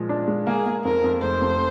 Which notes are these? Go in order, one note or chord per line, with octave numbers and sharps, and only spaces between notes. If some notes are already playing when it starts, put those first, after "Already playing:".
Already playing: A#2 F3 G#3
D4
G#3
A#3 G#4
A#3
F2 A#4
F2
F1 C5
F2